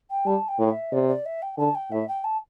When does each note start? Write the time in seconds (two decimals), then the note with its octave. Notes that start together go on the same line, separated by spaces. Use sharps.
0.10 G5
0.26 G3 A5
0.48 G5
0.59 A2
0.70 E5
0.92 C3 D5
1.08 D5
1.25 E5
1.42 G5
1.58 D3 A5
1.75 G5
1.91 A2 E5
2.08 G5
2.24 A5